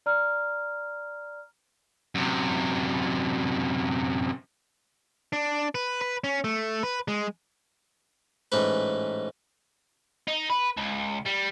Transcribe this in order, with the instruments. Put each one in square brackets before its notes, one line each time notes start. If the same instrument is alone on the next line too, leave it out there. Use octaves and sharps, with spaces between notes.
[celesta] D5 A#5 F6
[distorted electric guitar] F#2 C3
[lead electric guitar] D4
B4
B4
C#4
A3
B4
G#3
[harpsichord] A1 G#2 B4
[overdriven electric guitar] D#4
B4
C#2
G3